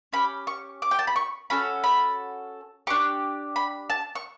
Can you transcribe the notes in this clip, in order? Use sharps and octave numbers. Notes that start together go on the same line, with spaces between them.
C#4 G4 B5
C#6
D6
G5
A5
B5
C#6
C#4 F#4 A4 B5
B5
D4 G4 C#6
B5
A5
C#6